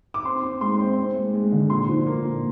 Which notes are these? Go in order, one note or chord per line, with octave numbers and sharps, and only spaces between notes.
D6
C4 C6
C4
G#3 C6
C4
C4
G#3
G#3
D3
A#2 C6
F3
A#3
A#2